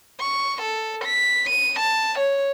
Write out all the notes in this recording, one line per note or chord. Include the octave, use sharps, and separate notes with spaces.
C#6
A4
B6
D#7
A5
C#5